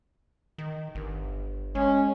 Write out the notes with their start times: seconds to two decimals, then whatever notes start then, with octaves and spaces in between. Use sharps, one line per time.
0.58 D#3
0.95 G1
1.75 G#3 C#4